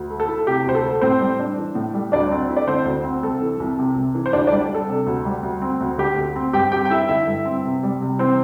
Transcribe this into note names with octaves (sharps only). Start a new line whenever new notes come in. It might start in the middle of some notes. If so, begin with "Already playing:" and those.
Already playing: D2
A3
A4
E4
C3 G4
D2 C5
A4
A3
A2 C4 C5
G3
D4
E3
A2
G3
D2 D4 D5
C4
E4
D5
D3 C4 C5
D2
C4
C2 A4
E3
C2
C3
C2
E3
C5
D2 D4 D5
D4 D5
G3
D4 A4
C3
D2
G3
D2
C4
D2
D3 G4
D2
C4
G2 G4 G5
C4 G4 G5
G5
E4 E5
D3 E4 E5
G2
C4
C3
G3
C3
E3 C4 C5